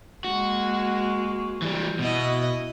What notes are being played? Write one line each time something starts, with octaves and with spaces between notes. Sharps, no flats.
G#3 A#3 F#4
E3 G3
B2 E4 F#4 D#5